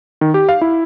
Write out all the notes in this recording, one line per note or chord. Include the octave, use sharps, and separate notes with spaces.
D#3
G4
F5
E4